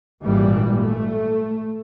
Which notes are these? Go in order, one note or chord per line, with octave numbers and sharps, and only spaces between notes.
G#1 A#2 E3 G3
A3